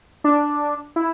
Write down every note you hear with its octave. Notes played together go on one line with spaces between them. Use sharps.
D4
E4